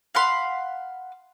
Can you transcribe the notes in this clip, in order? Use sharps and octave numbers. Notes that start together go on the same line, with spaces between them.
F5 F#5 B5 C6